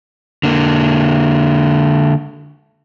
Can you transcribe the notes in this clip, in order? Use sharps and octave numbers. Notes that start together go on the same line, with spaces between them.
D3 A#3